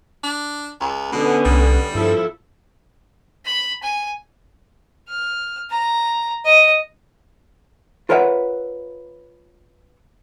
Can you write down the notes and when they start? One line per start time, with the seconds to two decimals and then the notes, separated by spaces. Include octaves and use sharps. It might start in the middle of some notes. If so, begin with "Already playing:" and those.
0.23 D4
0.81 C#2
1.12 B2 D3 B3 C#4
1.45 C2 G3
1.95 G2 F3 E4 A4
3.45 B5
3.83 G#5
5.08 F6
5.71 A#5
6.45 D#5
8.09 F4 A#4 B4 C#5 E5 F#5